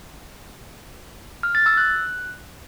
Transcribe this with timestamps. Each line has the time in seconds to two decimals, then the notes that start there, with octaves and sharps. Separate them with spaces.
1.43 F6
1.55 A6
1.66 E6
1.77 F#6